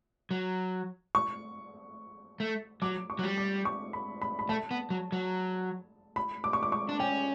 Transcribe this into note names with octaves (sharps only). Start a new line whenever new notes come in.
F#3
C#6
A3
F#3 D6
C#6
F#3
G3
D6
C#6
B5
B5
B5
A3 A5
B3
F#3
F#3
B5
D6
C#6
D6
C#6
D4
C#4 G5